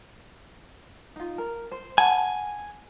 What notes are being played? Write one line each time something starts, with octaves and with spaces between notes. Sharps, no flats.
D#4 F4
A#4
C5
F#5 G#5 A5 B5